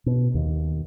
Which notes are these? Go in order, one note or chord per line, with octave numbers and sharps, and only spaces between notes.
B2
D#2